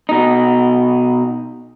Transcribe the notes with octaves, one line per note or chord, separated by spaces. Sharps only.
B2 D#4